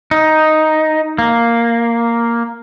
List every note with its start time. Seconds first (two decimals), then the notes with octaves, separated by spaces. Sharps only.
0.11 D#4
1.18 A#3